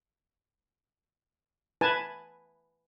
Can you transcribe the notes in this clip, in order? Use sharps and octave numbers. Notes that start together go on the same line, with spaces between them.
E4 B4 G#5 A5